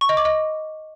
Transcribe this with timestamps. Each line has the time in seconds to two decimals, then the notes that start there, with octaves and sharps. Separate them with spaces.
0.01 C#6
0.09 D#5
0.17 D6
0.25 D#5